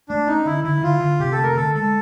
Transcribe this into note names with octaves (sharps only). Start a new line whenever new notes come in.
A3 D4
C#4 D#4
D3 E4
D3 E4
D3 F4
D3
C3 G4
A4
A3
A#4
D3 A4
G#3 A4